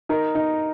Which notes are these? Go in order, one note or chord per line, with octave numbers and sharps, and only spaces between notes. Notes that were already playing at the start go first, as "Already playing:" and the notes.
D#4 A#4
D#4